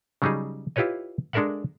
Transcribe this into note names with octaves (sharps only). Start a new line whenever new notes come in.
C#3 F#3 G3 D#4 G#4
E4 F4 G4 B4 C#5 D#5
G#3 D4 A4 A#4 E5 F#5